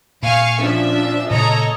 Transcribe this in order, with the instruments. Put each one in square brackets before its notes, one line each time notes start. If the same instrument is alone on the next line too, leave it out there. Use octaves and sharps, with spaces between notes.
[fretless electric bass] A#2 [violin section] F5 G#5 C#6
[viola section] F3 C#4 D4 [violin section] E5
[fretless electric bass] A#2 C#3 [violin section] A4 C#5 A#5 [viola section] D#5